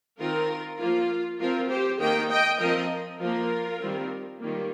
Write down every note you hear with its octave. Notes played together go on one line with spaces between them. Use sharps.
D#3 C4 F4 A#4
F3 A#3 F4
F3 C4 F4 A#4
G4 C5
D#3 A#3 D#5 G5
D#5 G5
F3 C4 A#4 D#5
F3 A#3 F4 A#4
D#3 G3 C4
D#3 G3 A#3 F4